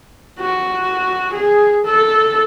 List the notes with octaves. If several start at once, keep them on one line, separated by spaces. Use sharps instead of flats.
F#4
G#4
A4